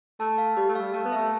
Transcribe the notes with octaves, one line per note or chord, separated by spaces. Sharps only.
A3 A5
F5
G3 G4
A3
F5
G3
A3 A5
B3
A3 E5